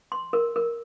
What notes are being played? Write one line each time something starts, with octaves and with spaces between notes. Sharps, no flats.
C6
A#4
A#4